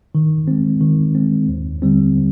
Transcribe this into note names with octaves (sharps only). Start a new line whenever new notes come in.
D#3
G#3 C4
D#3
G#3 C4
D#2
D3 G3 C4